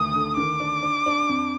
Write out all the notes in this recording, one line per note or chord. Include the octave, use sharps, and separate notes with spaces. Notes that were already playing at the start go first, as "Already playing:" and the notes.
Already playing: D2 D#3 D#6
D3
D#3 D6
D4
D4
D4
F2